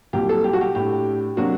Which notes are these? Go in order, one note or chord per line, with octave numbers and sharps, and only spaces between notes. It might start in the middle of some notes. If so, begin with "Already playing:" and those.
C2 A#2 F#3 G4
A4
G4
F#4
G4
A2 A3 D4 G4
C3 F#3 A#3 D4 F#4